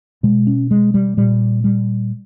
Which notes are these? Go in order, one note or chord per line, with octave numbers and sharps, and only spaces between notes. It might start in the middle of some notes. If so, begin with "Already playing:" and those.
B2 G#3
C#4
G#3
G3
A#2 G3
G3